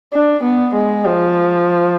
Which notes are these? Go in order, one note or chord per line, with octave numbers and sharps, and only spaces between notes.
D4
B3
G#3
F3